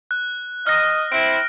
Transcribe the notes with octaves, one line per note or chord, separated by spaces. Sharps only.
F#6
D#5 F6 A#6
C4 E4 D7